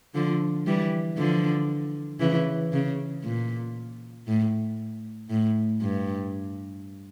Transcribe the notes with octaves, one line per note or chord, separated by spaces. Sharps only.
D3 F3
E3 G3
D3 F3
C#3 E3
C#3
A#2
A2
A2
G2